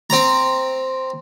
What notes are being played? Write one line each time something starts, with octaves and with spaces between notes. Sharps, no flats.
C4 A#5